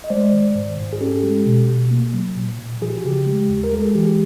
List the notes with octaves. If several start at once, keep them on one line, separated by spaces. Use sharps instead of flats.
D#5
G#3 C5 D5
D#3
G#2
G#2
G#4
C#4 G4 A4
G#3
B2
B2
A#3
F#3
A#2
A#2
F3 G#4
G4
F#4
C#3 G4
G#3
D#2
A#4
G#3 A4
G#4
E3 G4
G4